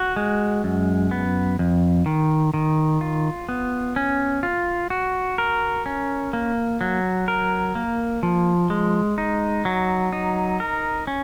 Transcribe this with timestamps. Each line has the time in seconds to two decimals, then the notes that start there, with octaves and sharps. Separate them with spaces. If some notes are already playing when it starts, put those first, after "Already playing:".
Already playing: F#4
0.16 G#3
0.64 F#2
1.11 B3
1.59 F2
2.06 D#3
2.54 D#3
3.01 F4
3.49 B3
3.96 C#4
4.43 F4
4.90 F#4
5.38 A#4
5.86 C#4
6.33 A#3
6.81 F#3
7.28 A#4
7.75 A#3
8.23 F3
8.70 G#3
9.18 D#4
9.65 F#3
10.13 D#4
10.60 A#4
11.07 C#4